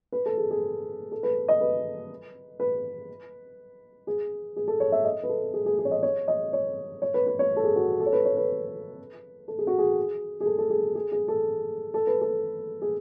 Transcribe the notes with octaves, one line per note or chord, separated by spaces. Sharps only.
B4
A4
G#4
G#4
A4
B4
D#5
B4
B4
G#4
G#4
A4
C#5
E5
D#5
B4
A4
G#4
G#4
G#4
C#5
D#5
C#5
D#5
C#5
C#5
B4
B4
C#5
A4
G#4
F#4
A4
C#5
B4
C#5
B4
A4
G#4
F#4
G#4
G#4
A4
A4
G#4
G#4
G#4
A4
A4
B4
A4
G#4